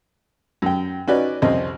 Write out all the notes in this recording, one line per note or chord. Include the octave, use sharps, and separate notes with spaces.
F#2 G5
C#4 D#4 F#4 B4 D5
C2 F2 C4 C#4 D#5